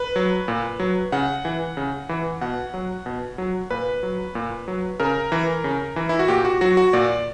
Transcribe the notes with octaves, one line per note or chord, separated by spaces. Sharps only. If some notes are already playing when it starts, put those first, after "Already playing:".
Already playing: B4
F#3
A#2
F#3
C#3 F#5
E3
C#3
E3
B2 F#5
F#3
B2
F#3
A#2 B4
F#3
A#2
F#3
C#3 A#4
E3
C#3
E3
E4
F#4
A#2 G4
F#4
F#3 F#4
F#4
A#2 D5